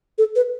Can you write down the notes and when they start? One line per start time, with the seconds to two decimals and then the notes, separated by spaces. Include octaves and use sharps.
0.18 A4
0.36 B4